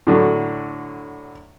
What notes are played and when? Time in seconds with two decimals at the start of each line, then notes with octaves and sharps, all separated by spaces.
0.07 A2 D3 F#3